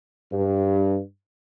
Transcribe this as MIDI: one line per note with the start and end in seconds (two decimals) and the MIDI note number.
0.32 0.99 43